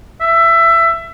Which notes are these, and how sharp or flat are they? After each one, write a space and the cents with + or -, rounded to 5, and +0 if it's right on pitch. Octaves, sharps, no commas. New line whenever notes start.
E5 +20